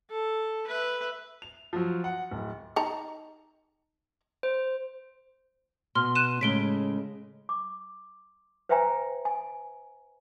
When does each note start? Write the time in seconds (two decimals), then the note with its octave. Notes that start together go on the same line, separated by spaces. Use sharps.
0.10 A4
0.67 B4 E5
1.42 F7
1.73 F3 F#3
2.04 F#5
2.31 D1
2.76 D#4 A5 A#5
4.43 C5
5.95 B2 C6 F6
6.15 F#6 D#7 E7
6.41 A2 C#3 G#3 B6 D7 G7
7.49 D6
8.69 B4 C5 E5 G5 G#5 A#5
9.25 G#5